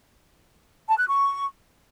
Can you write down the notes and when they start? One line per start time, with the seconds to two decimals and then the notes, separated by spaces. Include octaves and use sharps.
0.89 A5
0.98 F#6
1.08 C#6